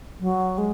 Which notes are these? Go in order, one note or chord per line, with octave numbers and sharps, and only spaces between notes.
F#3
G#3